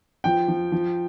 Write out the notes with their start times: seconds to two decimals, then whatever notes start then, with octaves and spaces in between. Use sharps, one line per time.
0.24 F3 G5
0.48 F3
0.72 F3